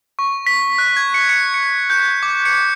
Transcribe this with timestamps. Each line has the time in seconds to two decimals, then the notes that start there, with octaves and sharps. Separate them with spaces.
0.19 C#6
0.47 B6
0.78 F#6
0.97 G#6
1.14 C#7
1.29 C#7
1.54 C#7
1.90 G6
2.23 D6
2.45 C#7